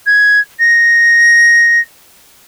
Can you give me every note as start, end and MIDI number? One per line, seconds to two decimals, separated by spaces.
0.06 0.39 92
0.59 1.79 94